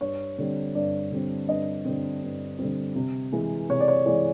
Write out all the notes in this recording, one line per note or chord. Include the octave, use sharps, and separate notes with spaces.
G2 C#5
D3 G3 C4
G2 D5
D3 G3 C4
G2 D#5
D3 G3 C4
G2
D3 G3 C4
C3
E3 G#3
C3 C#5
D5
C#5
E3 G#3 D5